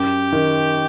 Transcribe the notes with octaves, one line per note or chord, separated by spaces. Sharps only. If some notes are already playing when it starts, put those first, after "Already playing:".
Already playing: F#2 G4
D#3